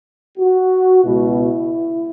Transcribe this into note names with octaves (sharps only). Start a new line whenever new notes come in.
F#4
C#2 B2 G#3 B3 E4